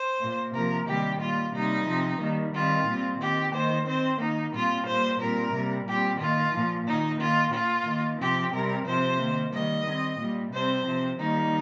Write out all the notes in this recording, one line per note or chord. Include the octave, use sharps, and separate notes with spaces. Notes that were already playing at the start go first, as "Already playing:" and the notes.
Already playing: C5
A#2 A#3
C3 F3 A#3 A#4
C3 D#3 G3 A#3 G4
A#2 G3 A#3 F4
C3 G3 A#3 D#4
C3 F3 C4
D#3 G3 A#3
D#3 G3 C4 F4
A#2 G3 C4
D#3 C4 G4
D#3 A#3 C5
D#3 C4 C5
D#3 A#3 D#4
A#2 G3 C4 F4
A#2 G3 A#3 C5
A#2 G3 C4 A#4
C3 G3 A#3
A#2 G3 C4 G4
D#3 A#3 F4
A#2 F3 A#3
D#3 A#3 D#4
D#3 A#3 F4
A#2 A#3 F4
D#3 A#3
C3 F3 C4 G4
C3 G3 C4 A#4
C3 F3 C4 C5
D#3 A#3
D#3 G3 A#3 D#5
D#3 C4
A#2 G3 A#3
C3 G3 C4 C5
C3 F3 C4
D#3 G3 A#3 D#4